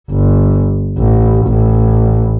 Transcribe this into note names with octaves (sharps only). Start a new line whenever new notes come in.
G1
A1
A1